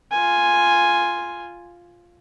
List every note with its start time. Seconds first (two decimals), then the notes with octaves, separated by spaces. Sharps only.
0.11 F4 G#5